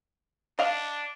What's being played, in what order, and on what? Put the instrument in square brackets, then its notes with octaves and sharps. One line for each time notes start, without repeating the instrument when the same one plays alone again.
[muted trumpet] D4 [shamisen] D#5 F5